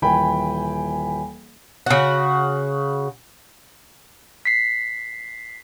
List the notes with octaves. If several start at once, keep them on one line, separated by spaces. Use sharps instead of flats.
D#1 E3 G5 G#5 B5
C#3 F#4
B6 C7